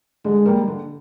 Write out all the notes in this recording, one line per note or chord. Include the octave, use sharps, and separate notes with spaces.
D3 G#3
G3 A#3
D3